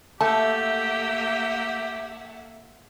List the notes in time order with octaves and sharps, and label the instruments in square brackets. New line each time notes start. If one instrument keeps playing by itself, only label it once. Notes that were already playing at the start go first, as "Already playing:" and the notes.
[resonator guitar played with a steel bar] A3 [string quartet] A#3 E5 F#5 [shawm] G4 [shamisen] A5